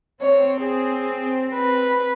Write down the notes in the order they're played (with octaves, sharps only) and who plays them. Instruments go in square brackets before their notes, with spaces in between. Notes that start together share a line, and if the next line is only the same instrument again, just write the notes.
[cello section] C4 [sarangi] C#5
[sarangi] G#4
B4